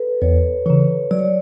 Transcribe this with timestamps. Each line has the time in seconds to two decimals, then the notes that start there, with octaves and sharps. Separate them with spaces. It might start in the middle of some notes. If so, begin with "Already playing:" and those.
Already playing: A4 B4
0.22 E2 C#5
0.66 C#3 E3 C#5
1.11 F#3 D5
1.19 C#5